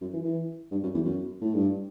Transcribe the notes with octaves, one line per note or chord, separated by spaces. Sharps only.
F#2
E3
E3
G2
F#2
E2
F#2
A2
G2